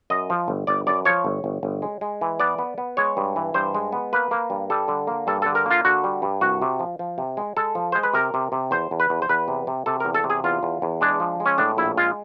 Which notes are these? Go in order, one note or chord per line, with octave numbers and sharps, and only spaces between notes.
F#2 D#5
F3
G1
G1 D5
F#2 D5
F3 C#5
G1
G1
G1
G#3
G#3
E3
B3 D5
B3
B3
G#3 C#5
G2
E3
G2 C5
G#3
B3
A#3 B4
A#3
G2
G3 A4
D3
A#3
G2 A4
D3 A4
A#4
A#3 F4
D3 F#4
G3
G2
C2 F#4
C3
F3
F3
C3
G#3
G#3 A4
F3
G#3 C5
B4
C3 A#4
C3
C3
E2 C5
E2
B4
E2
C5
E2 B4
C3
C3
C3 A4
E2 A#4
A4
C3
G#4
E2 F4
E2
E2
G#3 D4
F3
G#3
C#4
A2 D4
A#1 E4
G#3 F4